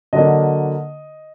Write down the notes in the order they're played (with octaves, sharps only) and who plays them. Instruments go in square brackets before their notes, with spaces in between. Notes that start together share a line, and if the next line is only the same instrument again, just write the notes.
[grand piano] D3 F#3 A#3 D4 D#5